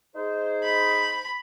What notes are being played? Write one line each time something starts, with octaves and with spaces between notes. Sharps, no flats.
D#4 G#4 C5
B5